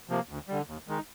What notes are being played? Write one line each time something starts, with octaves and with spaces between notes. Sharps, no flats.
C3 F3 A#3
D2
D3 G3
D#2
D#3 G#3 D#4